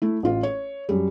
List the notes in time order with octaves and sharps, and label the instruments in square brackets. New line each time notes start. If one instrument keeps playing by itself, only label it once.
[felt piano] A3 E4
A1 F4
C#5
F#2 G3